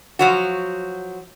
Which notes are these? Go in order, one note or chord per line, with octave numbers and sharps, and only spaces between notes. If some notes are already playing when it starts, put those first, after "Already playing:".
F3 F#3 F#4